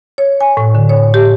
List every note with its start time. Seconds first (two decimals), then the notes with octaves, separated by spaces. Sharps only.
0.18 C#5
0.41 G#5
0.57 A2
0.75 D3
0.89 C#5
1.14 G4